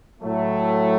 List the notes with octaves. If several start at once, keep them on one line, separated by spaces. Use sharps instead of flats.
A2 F#3 A3